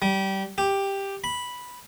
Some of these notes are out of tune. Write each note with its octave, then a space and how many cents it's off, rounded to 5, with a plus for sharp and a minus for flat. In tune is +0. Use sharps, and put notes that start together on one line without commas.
G3 -20
G4 +5
B5 -5